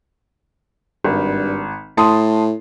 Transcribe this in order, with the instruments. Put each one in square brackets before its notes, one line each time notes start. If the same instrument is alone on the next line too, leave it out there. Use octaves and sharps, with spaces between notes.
[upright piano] G#1 [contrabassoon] G2
[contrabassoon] A2 [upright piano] A5 C6 D#6